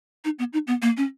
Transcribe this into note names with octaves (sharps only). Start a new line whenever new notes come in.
D#4
B3
D#4
B3
A#3
C#4